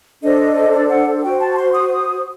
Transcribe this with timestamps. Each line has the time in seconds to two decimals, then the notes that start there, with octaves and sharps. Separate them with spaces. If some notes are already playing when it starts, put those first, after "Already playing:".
0.22 D4 A4 C5 D#5
0.73 D5
0.90 F#5
1.23 F#4 C5 G5
1.40 A5
1.57 C6
1.74 D#6